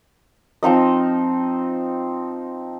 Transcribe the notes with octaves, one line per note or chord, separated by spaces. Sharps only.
F3 C4 D#4 D#5